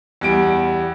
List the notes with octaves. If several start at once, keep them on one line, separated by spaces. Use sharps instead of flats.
E2 G3 D7